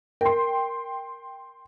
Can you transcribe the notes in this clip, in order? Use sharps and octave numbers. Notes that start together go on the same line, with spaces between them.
A#4 G5 C6